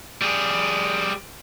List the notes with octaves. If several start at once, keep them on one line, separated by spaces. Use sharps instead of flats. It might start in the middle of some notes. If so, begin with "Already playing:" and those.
G3 G#4